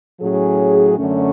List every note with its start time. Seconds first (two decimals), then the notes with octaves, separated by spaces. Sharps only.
0.20 A2 F#3 C#4 G#4
0.97 F#2 D3 F#3 A3 C#4